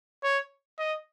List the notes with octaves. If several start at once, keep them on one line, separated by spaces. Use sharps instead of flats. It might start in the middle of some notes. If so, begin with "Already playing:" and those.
C#5
D#5